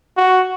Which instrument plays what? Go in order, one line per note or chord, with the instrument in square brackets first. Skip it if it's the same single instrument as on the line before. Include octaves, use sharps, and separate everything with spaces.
[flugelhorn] F#4